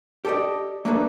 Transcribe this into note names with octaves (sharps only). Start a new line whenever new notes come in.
G4 A4 C5 D5 D#5
A3 A#3 D4 D#4 A4 B4